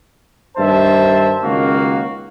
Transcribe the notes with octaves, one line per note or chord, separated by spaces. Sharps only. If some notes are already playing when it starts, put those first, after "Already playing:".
G2 D#3 C5 E5 A5
C#2 D#3 A#3 F#4 F5